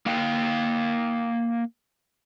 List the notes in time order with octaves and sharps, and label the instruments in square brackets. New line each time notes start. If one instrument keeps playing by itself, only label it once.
[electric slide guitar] A#3 F5 G5